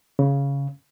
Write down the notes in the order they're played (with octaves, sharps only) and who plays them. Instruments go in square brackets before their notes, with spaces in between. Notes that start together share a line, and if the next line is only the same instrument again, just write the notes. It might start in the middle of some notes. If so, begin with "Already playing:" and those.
[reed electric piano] C#3